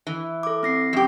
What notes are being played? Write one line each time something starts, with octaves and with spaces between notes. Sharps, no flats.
E3
A4 D6
C4 A#6 C7
F#2 G4